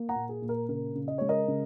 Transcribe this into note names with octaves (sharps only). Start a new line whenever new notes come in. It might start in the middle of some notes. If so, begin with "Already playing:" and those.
Already playing: A#3
F#5 A#5
A#2
G#4
A#2
A#4
C#3 A#4
C#3
D#5
G#3 C#5
A#4 D#5
C#3